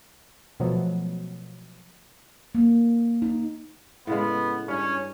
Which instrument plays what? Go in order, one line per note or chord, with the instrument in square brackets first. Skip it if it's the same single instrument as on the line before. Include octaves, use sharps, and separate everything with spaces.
[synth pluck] B2 F3 F#3 A3
[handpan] A#3
D#4
[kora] A2 C#3 G#3 [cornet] B3
[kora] G2 [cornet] C#4